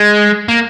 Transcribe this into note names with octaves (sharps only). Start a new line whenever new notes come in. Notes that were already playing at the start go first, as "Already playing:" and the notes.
Already playing: G#3
A#3